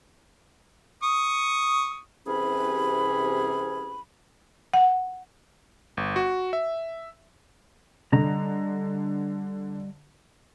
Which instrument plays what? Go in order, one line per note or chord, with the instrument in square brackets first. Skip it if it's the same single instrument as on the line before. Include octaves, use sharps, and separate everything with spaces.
[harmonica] C#6 D#6
[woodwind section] C2 C3 E3 C#4 G#4 B5
[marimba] F#5
[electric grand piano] G1
F#4
E5
[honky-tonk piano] D3 [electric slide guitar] G3 D#5 A#5